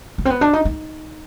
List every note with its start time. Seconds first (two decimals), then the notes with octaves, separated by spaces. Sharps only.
0.18 A#3
0.25 C4
0.30 B3
0.41 D4
0.53 D#4
0.65 D#4